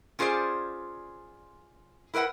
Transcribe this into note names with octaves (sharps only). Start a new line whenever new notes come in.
C#4 F4 G#4 C5 D5
E4 A#4 B4 D#5 F#5